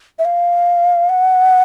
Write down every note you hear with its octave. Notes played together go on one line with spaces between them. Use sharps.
E5
F5
F#5